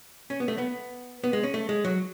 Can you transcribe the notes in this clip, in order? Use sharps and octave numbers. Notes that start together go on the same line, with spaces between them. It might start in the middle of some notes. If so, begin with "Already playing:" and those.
C#4
B3
A3
B3
B3
G#3
C#4
A3
G#3
F#3